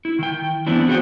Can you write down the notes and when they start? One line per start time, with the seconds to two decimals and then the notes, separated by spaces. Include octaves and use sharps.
0.05 E4
0.19 D#3 G5
0.66 E3 B3 C4 D4 E4
0.88 F#4 G#4 C5 D#5 G5